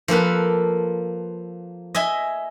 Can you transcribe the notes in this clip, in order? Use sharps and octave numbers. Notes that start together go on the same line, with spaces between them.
F3 A#3 A4 B4
D#5 E5 G#5